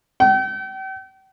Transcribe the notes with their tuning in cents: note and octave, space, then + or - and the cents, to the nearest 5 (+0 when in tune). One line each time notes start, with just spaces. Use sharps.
G5 -40